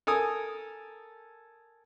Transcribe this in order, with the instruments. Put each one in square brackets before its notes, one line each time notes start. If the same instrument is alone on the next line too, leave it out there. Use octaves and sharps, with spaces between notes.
[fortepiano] A4 A#4 G#5 D#6